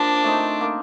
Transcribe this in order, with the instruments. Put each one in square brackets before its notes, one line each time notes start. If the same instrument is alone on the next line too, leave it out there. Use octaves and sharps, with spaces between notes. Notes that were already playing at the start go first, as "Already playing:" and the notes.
Already playing: [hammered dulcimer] F3 A#3 [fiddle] D4
[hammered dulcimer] A3 C4 D#4
A#3